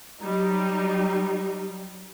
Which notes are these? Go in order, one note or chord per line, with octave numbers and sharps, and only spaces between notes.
F#3 G3 D#4